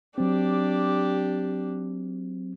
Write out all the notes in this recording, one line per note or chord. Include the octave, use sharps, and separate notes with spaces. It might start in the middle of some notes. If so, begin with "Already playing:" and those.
F#3 C4 D4 G4